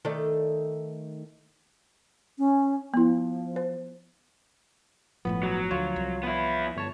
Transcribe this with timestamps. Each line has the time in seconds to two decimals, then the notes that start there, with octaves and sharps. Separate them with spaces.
0.05 D#3 A3 D5
2.38 C#4
2.94 F3 B3 E4
3.56 C5
5.25 G1 A2 F3 A3 B3
5.43 F#3
5.71 D2 F4 C#5
5.96 C2
6.23 B3 E4
6.76 G1 C#5 A5